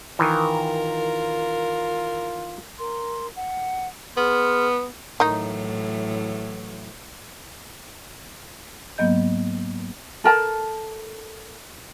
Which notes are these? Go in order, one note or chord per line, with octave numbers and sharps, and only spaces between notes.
D#3 E3 F4 A#4
A#4 C6
F#5
B3 G#4 C6 F6
A2 D#3 E3 F#3 D#4
G#2 F#3 A#3 B3 D#5 G6
A4 A#4 A5